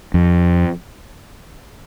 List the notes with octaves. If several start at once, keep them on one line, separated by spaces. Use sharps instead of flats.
F2